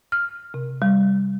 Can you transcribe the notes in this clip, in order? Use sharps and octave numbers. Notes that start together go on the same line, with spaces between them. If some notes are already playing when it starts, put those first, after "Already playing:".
F6
C3
G3